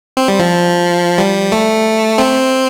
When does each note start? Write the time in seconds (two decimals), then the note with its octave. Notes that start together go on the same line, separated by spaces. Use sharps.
0.17 C4
0.28 G3
0.39 F3
1.18 G3
1.52 A3
2.18 C4